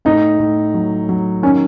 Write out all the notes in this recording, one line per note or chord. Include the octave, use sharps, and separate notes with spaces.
A2 D#4
A2
F#3
F#3
D#3 C#4